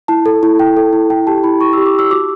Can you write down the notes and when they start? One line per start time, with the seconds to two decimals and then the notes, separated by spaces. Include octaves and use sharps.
0.08 E4 A5
0.26 A4
0.43 E4
0.59 E4 G5
0.77 A4
0.93 E4
1.10 E4 G5
1.27 G4 A5
1.44 E4 B5
1.60 E4 C#6
1.73 G4 E6
1.86 D6
1.95 G4 E6
2.11 F#4 D6